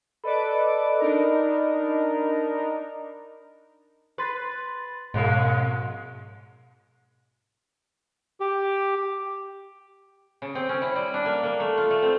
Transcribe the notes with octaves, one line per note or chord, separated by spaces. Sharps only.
A4 B4 D5 D#5 B5 D6
D4 D#4 A#4
B4 B5 C6 A6
F2 G#2 B2 G#3 F5
G4
C#3
C4
C#4
E4
G3
D4
A#3
A#3
A3
F4
A3
C4